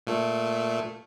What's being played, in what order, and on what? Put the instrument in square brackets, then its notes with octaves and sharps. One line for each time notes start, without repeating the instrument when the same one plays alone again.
[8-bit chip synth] A#2 A3